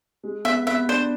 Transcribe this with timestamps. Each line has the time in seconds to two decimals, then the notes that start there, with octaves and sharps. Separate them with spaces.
0.23 G#3
0.45 B3 E5
0.66 B3 E5
0.88 D4 C5